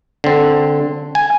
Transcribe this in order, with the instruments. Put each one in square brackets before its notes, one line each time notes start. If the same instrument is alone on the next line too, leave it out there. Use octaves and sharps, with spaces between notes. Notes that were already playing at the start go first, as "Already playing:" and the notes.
[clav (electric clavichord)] D3 C4
G#5